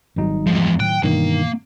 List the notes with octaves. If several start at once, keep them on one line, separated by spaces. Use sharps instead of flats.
G#1 G#2 F#3 G3 D#4
E2 F3 G#3
A2 D#3 F#3 G5 F#6
G2 B2 D#3 E3 A#3